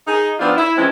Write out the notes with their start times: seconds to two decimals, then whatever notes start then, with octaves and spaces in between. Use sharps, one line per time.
0.07 D#4 G#4
0.40 F3 B3 C4 D4 D#4 F4
0.57 E4
0.77 E3 F3 G#3 C4 C#4 E4